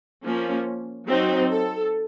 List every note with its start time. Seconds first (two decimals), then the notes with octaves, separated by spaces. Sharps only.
0.24 F3 A#3 C#4
1.07 F#3 C4 D#4
1.50 A4